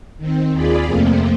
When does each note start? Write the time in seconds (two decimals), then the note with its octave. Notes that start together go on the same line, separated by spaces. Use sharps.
0.18 D#3 C4
0.52 D#2 F4 G#4 D5 B5
0.86 F2 C3 F3 A3 A#3 C4